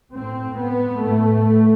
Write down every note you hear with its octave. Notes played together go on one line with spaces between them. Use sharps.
A2 C4
B3
A2 A3